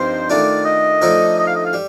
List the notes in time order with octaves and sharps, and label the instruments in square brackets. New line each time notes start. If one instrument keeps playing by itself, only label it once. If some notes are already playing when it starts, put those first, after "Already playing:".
Already playing: [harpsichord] G2 F3 C4 D#4 A#4 [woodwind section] C5
[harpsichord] D#3 A3 D4 F4 [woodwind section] D5
[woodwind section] D#5
[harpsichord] D3 F3 A3 D#4 A4
[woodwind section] D#5
F5
D#5
F5
[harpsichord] G3